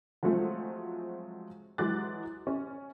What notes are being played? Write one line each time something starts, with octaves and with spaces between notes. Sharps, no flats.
F3 F#3 G#3 A3 C4
E3 F#3 G#3 D6 F#6 A6
C#4